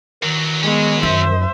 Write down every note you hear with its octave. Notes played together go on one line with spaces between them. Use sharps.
E2 D#3 F#3
F#3 G#3 B3 C#4
F#2 C5 E5